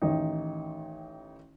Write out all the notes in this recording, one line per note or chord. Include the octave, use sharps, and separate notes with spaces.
A1 D#3 D#4